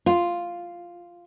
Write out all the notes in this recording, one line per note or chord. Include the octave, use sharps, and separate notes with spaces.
F4